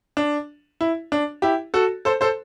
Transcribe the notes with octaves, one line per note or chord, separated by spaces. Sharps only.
D4
E4
D4
E4 G4
F#4 A4
A4 C5
A4 C5